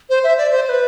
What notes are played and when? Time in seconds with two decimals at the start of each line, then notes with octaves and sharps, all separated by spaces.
0.10 C5
0.24 E5
0.38 D5
0.51 C5
0.65 C5
0.69 B4